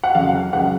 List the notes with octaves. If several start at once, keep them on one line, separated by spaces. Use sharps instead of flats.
F#5
F2 C#3 F#3 F5
C#2 C#3 F#3 F#5